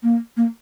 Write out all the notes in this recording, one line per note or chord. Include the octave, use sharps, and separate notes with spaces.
A#3
A#3